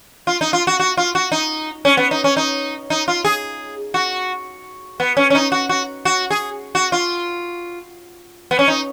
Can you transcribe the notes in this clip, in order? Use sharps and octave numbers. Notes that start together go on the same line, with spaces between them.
F4
D#4
F4
F#4
F#4
F4
F#4
D#4
C#4
B3
D#4
C#4
D#4
D#4
F4
G#4
F#4
B3
C#4
C#4
D#4
F#4
F#4
F#4
G#4
F#4
F4
B3
C#4
D#4